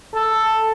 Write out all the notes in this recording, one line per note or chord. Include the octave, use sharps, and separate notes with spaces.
A4